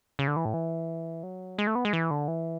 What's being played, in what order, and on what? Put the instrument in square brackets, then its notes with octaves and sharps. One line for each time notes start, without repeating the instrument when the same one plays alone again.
[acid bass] C#3
D3
E3
A2
E3
F#3
G#3
A3
B3
G#3
E3
D3
E3